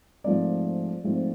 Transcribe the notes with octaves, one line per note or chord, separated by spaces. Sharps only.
G#2 F3 A3 C4 D5
G#2 F3 A3 C4